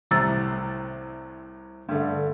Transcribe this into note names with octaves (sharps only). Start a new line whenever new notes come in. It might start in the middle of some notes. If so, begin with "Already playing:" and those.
C2 A2 C3 A#5 E6 A6
G2 D3 A3